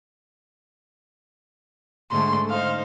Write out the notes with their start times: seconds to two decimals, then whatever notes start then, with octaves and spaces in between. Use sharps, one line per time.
2.11 G#2 D3 A3 C6
2.50 D#4 C5 F5